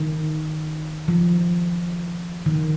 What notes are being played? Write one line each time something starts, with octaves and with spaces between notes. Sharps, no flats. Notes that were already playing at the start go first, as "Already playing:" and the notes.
Already playing: D#3
F3
D#3